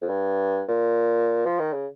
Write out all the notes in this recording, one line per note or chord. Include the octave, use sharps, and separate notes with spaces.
F2
G2
A#2
F3
D#3
C#3